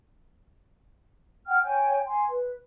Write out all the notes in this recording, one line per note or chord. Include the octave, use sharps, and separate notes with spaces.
F#5 G5 F6
C#5 G5 G#5
G#5 C6
B4